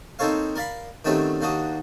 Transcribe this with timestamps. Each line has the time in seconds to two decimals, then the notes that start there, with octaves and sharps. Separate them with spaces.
0.19 A#3 C4 D#4 A4 C#5 F5
0.56 A#4 D5 F5 B5
1.05 D#3 F#3 G3 A3 C4 C#4
1.41 D#2 A#3 D4 F#4 D#6